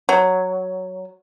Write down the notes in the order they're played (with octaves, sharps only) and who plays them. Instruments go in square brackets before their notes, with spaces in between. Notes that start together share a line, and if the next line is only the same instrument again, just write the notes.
[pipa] F#3